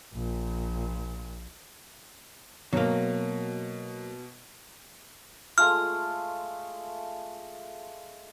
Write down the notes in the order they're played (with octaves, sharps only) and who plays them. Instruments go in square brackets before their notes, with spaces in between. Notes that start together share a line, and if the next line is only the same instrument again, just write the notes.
[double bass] A#1 A#2
[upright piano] B2 [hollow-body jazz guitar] F#3 A#3
[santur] G#3 A3 F4 [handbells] F6